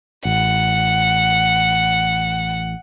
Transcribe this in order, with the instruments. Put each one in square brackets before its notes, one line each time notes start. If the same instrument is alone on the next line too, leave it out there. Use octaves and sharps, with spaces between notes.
[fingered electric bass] A1 [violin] F#5